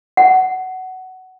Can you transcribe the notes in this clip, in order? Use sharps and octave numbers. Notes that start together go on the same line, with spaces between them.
F#5